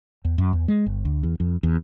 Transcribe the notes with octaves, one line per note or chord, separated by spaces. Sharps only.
E2
F#2
E2
G#3
G1
D2
E2
F2
E2